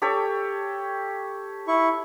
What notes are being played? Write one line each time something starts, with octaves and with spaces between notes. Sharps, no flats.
G4 A4 C#5
E4 C#6